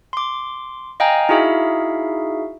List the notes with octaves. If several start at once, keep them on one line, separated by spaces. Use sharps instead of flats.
C6 D6
D#5 F5 G5 G#5 A#5
D#4 E4 F#4 G#4 E5 F5